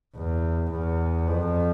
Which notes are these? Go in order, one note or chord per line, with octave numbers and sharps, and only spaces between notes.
E2
E2
F2